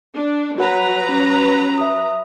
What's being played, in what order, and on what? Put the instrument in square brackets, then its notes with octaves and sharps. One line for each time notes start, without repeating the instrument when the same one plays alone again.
[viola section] D4
[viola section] F#3 B4 A#5 [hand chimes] F#4 C#5 F#5
[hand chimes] C#4
E5 D#6